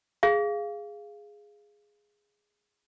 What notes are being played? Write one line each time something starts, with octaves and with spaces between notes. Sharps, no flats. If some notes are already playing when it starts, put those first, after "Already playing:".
G#4 F5